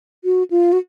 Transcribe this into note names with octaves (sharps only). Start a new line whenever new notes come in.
F#4
F4
F#4